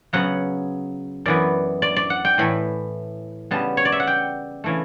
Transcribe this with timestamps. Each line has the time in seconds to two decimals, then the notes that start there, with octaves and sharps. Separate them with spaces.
0.13 C#3 F#3 B3 F#5
1.26 F#2 E3 B3 D5
1.82 D5
1.96 D5
2.10 F#5
2.25 G5
2.38 A2 E3 A3 B5
3.51 C#3 G3 B3 A5
3.77 C#5
3.85 D5
3.92 E5
4.00 F#5
4.07 G5
4.64 C#3 E3 A3